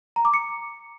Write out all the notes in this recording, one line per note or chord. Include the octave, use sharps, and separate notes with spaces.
A#5
D6
C#7